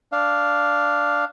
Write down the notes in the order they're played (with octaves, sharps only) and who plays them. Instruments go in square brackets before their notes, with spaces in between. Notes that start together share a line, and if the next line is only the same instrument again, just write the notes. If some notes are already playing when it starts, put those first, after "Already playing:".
[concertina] D4 F5